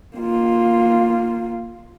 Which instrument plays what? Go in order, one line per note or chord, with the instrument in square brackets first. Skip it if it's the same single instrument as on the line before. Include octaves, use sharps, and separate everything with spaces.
[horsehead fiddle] A#3 F4